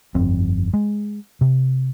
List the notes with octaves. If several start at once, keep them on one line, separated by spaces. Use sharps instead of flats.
G1 F2 C4
G#3
C3